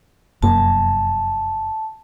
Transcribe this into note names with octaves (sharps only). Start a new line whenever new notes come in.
F1 F#2 A#3 A5